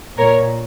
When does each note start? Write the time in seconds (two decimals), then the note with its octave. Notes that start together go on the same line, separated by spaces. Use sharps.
0.18 A#2 A#4 C#5